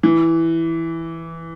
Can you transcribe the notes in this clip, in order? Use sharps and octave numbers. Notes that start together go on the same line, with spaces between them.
E3